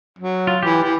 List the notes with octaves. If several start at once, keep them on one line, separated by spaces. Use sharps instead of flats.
F#3
F4
E3 G4
E3